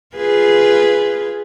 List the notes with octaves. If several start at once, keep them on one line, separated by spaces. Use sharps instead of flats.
F4 G#4 B4